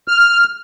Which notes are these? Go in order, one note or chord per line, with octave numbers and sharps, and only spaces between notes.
F6